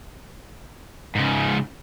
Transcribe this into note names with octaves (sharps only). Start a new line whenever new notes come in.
G#2 C#3